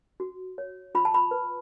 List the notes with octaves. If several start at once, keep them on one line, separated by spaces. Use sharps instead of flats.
F#4
C#5
F4 B5
A5
B5
B4